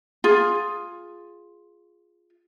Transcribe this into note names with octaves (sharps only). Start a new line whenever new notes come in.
F4 G#4